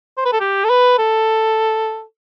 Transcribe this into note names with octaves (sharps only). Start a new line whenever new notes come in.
C5
B4
A4
G4
A4
B4
A4